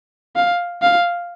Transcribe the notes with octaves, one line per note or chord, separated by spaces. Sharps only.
F5
F5